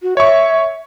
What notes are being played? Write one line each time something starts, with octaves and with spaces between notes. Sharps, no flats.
F#4
C#5 E5 C#6